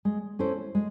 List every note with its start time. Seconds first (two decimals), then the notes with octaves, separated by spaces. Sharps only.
0.05 G#3
0.39 C#4 E4 A4 C5
0.75 G#3